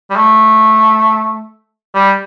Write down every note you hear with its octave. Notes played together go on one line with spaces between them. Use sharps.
G3
A3
G3